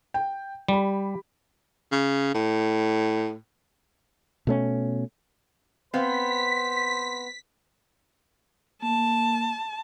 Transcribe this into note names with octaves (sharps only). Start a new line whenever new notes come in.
G5
G3 G4 B5
C#3
A2
B2 A3 C#4
B3 C4 C5 F5 B6
A#3 A5